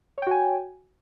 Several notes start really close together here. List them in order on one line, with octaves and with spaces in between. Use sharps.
C#5 G5 F#4 G#5